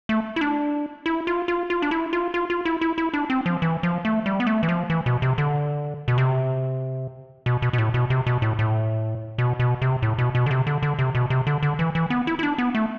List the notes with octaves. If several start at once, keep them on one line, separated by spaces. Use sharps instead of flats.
A3
E4
D4
E4
F4
F4
F4
D4
E4
F4
F4
F4
E4
E4
E4
D4
C4
F3
E3
F3
A3
G3
B3
A3
E3
F3
E3
B2
C3
D3
B2
C3
B2
B2
B2
A2
B2
C3
B2
A2
A2
B2
B2
C3
A2
B2
B2
D3
C3
D3
D3
C3
B2
C3
D3
D3
E3
E3
B3
E4
E4
D4
B3
A3